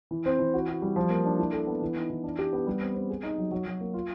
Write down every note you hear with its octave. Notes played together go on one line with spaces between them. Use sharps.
E3
C4
E3
F#4
F#4
G3
F3
A#3
D4
E4
A4
B3
E3
D#4
E3
D4
G4
B3
G3
C4
C4
G#4
D#4
F#3
F#3
F#3
A#3
F4